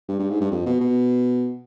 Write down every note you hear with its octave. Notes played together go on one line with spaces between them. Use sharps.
G2
G2
G#2
G2
F2
B2
B2